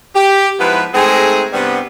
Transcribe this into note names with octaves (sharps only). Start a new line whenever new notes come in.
G4
G#2 F3 B3 E4 B4
G#3 A3 C4 D#4 G#4
G2 C3 G3 B3